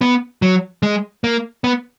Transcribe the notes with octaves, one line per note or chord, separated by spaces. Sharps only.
B3
F#3
G#3
A#3
B3